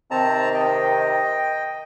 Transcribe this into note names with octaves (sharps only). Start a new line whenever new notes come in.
C3 D#3 C4 A5 A#5
D#5 G5